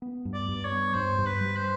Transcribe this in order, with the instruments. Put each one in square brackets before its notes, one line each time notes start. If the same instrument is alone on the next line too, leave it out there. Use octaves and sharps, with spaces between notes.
[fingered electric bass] B3
G2
[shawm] D5
[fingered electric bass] G2
[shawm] C#5
[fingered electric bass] B3
[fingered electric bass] G2 [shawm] C5
[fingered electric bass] G2
[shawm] B4
[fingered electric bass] G3
[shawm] C5